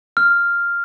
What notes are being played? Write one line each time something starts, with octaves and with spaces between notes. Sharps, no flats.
F6